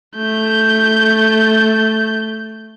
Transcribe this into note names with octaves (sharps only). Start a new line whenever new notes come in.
A3 G6